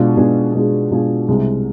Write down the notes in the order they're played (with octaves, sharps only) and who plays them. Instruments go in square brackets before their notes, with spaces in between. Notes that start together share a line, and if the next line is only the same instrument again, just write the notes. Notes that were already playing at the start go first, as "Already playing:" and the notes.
Already playing: [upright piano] B2 G#3 D4 F4 G#4
B2 G#3 D4 F4 G#4
B2 G#3 D4 F4 G#4
B2 G#3 D4 F4 G#4
C2 C3 G#3